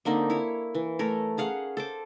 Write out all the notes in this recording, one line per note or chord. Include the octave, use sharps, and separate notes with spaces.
D3 A#3 C4 D#4
E4 C#5
E3
A3 A#4 C#5
C#4 G#4 F5 F#5
A4 C5 D6